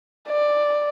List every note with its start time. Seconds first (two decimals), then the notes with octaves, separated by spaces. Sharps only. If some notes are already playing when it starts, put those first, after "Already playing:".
0.28 D5